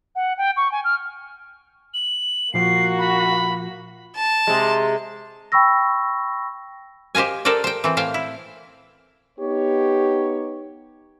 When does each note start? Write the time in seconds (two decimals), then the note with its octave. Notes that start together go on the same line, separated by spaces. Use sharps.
0.16 F#5
0.38 G5
0.57 C#6
0.72 G#5
0.84 F6
1.94 F#7
2.54 A#2 F3 A#3 F4 F#4 C7
2.99 B5
4.16 A5
4.47 C3 G#3
5.52 G5 B5 C#6 E6 A#6
7.15 G4 C5 D#5 F5 G#5
7.45 A4 A#4 C5 D5 G5
7.64 C5 G5
7.84 E3 C4
7.97 A2 C5 F5 G5
8.14 E4
9.39 B3 D#4 G4 C#5